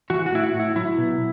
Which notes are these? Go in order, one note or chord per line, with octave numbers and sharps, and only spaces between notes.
E3 F#4
F#4
A2 E4
F#4
A2
E4
F#3 E4
B2